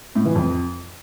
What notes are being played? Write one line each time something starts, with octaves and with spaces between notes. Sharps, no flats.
A2
E3
F2